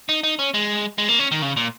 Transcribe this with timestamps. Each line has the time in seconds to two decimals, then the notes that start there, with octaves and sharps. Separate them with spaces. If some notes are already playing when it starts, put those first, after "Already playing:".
0.09 D#4
0.23 D#4
0.39 C#4
0.54 G#3
0.98 G#3
1.09 A#3
1.19 C#4
1.31 D#3
1.42 C#3
1.56 A#2